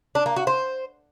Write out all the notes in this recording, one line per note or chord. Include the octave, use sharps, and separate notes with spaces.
D4
A#3
F#4
C5